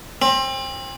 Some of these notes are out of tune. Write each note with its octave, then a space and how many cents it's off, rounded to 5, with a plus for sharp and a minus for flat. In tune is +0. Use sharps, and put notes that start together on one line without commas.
C4 +30